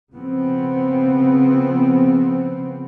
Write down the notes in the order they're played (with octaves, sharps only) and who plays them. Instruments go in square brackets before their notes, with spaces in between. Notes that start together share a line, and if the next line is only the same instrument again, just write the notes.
[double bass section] C#3 F3 B3 C4